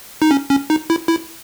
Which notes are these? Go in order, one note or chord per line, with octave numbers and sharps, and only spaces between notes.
D#4
C#4
C#4
D#4
E4
E4